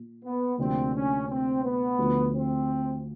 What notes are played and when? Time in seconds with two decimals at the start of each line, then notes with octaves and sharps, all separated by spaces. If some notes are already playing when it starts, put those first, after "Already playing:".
Already playing: A#2
0.23 B3
0.58 D2 C3 F3 A#3 C4 D4
0.94 C#4
1.29 C4
1.63 B3
1.98 D2 D3 F3
2.33 C4